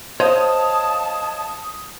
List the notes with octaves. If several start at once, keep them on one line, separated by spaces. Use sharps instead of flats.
C5 C#5 D#5 F5 A5 D#6